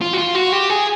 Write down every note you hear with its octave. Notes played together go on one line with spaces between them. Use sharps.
F4
F#4
F4
F#4
G4
G#4